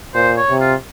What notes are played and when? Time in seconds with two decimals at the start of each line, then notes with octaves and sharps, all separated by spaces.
0.14 A#2 C5
0.37 C#5
0.50 C3
0.61 F4